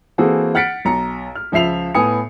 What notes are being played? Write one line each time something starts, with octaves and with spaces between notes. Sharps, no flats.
E3 A#3 C4 F#4 G#4 A4
F#5 F6 A6 B6 C#7 D7
B1 A#5 C#7
F6
C#2 F3 E5 C7 F7
A2 B3 G#5 D#6 C#7